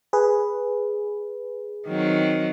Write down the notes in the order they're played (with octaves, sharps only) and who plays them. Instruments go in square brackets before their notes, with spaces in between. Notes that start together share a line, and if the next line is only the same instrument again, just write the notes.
[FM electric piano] G#4 B4
[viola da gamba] D#3 F#3 C4